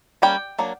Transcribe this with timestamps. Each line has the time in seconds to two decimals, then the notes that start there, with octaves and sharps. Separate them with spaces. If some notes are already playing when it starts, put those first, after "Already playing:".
0.22 G3 A#3 C#4 G5
0.59 F#3 A#3 D4